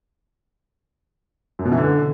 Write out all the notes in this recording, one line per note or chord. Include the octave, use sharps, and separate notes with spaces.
F#2
B2
E3
D3